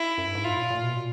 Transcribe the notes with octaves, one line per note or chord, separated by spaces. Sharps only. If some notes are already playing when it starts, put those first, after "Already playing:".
Already playing: E4
F#2
G2
G#2
A2 F4
A#2
A#2
B2
A#2